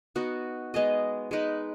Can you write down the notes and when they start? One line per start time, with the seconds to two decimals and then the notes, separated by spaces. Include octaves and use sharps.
0.15 B3 D#4 F#4
0.74 G#3 B3 G#4 D#5
1.31 G#3 D#4 B4